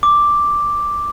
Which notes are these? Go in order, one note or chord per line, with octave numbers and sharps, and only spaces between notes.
D6